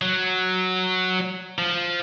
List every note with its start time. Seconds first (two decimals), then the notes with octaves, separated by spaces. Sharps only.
0.02 F#3
1.59 F3